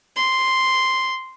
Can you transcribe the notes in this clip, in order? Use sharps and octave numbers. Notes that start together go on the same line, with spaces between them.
C6